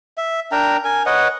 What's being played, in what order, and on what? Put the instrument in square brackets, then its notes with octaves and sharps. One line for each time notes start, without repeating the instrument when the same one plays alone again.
[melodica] E5
D4 A#4 G5 A#5
A#4 G#5
B4 C#5 D#5 F#5